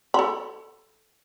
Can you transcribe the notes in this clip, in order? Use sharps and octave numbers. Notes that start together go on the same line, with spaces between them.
A4 B5